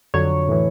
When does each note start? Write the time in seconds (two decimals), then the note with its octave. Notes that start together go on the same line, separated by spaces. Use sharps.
0.14 F2 D3 F#3 C#5
0.48 A2 E3